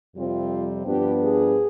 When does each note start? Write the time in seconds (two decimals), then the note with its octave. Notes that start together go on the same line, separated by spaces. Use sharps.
0.16 F2 C3 G3 C4 F4
0.86 G2 F3 B3 D4 G4
1.22 G#4